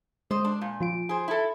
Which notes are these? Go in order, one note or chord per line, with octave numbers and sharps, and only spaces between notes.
G#3 C5 D#5
D4
A#2
F3 F4 D7
G#4 C5
E4 A4